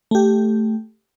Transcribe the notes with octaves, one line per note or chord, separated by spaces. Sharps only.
A3 G4